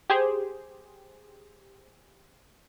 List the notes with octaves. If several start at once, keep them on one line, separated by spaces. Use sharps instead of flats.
G4 G#4 C5